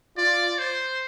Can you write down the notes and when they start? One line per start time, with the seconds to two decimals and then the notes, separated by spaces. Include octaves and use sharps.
0.17 F4 D5
0.59 C5